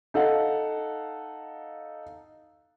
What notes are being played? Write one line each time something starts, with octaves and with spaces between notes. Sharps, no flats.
D#4 A4 F5 F#5